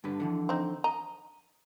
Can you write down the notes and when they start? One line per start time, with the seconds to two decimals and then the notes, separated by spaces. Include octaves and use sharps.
0.04 G2 D3 B4
0.20 D3 E3 F3
0.49 C4 D#4
0.84 D#5 A#5